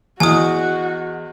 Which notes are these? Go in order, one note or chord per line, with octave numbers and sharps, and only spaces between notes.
E2 F#4 G#4 D#5 G#5 D#6